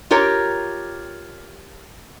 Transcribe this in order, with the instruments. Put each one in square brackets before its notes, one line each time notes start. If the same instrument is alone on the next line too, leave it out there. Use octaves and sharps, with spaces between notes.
[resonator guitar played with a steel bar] F4 G4 A#4 C#5